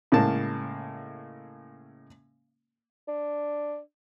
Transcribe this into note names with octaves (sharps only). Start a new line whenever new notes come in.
A2 C#3 G#3 A#3 F5 A5
D4